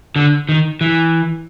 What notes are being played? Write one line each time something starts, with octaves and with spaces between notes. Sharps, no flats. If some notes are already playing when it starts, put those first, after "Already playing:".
D3
D#3
E3